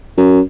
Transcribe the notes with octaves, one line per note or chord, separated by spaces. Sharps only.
F#2